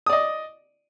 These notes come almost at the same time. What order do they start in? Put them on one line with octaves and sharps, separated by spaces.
D#6 D5 D#5